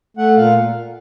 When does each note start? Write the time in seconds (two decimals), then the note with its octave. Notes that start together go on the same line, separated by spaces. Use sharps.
0.17 A3 F#5
0.36 A#2 F5